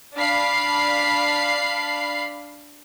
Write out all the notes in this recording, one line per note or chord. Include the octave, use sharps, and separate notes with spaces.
D4 F5 B5 C7